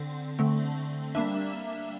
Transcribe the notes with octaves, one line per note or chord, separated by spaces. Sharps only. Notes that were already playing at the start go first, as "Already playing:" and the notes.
Already playing: D3 C4
D3 A3 C4
G3 A#3 D4 E5